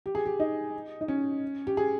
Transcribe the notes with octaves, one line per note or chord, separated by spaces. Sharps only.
G4
G#4
G4
D#4
D#4
C#4
G4
G#4